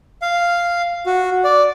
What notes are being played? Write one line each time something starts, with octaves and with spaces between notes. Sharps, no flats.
F5
F#4
D5